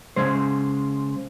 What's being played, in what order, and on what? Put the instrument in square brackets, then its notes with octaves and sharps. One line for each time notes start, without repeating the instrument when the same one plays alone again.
[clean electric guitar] C#3 G#3 C5